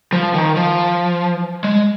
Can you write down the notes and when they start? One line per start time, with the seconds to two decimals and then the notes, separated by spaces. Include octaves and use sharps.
0.13 F3
0.34 D#3
0.56 F3
1.64 G#3